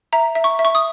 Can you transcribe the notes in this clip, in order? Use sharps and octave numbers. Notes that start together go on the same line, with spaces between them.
E5 A#5
E5
C#6
E5
C#6
D#6